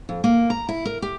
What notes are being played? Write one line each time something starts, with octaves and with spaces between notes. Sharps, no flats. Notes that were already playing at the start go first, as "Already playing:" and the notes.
F2
A#3
A#5
E4
A#4
G4